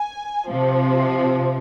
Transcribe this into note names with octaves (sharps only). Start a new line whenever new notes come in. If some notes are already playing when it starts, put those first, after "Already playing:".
Already playing: G#5
C3 F3